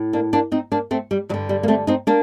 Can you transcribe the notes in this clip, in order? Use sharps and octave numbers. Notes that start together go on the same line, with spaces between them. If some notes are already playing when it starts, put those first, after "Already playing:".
Already playing: A2
A#3 D4
A#3 D4
C4 D#4
A#3 D4
A3 C4
G3
G2 D3 F#3
G3
A#3
A3 C4
C4 D#4
A#3 D4